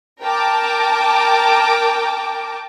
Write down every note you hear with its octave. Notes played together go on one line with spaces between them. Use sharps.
A#4 G5 A5 D6